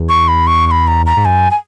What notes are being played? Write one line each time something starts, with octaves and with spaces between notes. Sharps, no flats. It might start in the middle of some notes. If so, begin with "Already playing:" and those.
Already playing: E2
C#6
B5
C#6
C#6
B5
A#5
A#5
G#2
F#2 G#5
G#5